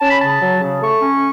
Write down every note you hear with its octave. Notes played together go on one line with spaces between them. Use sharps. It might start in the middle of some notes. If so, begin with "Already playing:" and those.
C#4 A5
B5
C#3 A5
F#3
C#3
A3 C#6
C#4